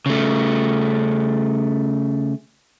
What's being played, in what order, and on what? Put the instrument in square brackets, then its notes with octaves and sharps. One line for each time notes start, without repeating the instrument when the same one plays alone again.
[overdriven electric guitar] C#3 A3